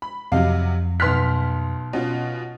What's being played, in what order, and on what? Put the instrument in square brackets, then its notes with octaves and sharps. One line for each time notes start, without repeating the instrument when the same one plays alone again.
[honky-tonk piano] B5
[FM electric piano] F2 [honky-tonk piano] C3 F#3 [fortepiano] D#5 F5
[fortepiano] B1 F#6 [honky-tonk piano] C6 F6 B6
[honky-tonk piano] B2 C#4 F4